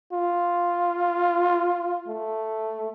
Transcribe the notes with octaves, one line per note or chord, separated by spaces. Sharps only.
F4
A3